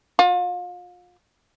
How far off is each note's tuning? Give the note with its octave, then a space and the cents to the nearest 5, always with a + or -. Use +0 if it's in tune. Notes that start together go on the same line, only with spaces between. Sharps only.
F4 +35